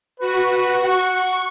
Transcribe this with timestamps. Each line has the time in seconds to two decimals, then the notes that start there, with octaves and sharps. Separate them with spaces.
0.20 F#4 B4
0.85 F#5 C#6